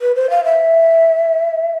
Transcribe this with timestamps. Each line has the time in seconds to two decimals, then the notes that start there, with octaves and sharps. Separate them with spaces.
0.01 B4
0.15 C5
0.30 F5
0.44 E5